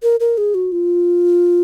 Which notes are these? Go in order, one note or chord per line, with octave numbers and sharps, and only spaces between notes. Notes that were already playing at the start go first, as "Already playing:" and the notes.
A#4
A#4
G#4
F#4
F4